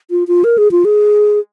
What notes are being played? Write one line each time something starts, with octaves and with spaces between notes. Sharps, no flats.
F4
F4
A#4
G#4
F4
G#4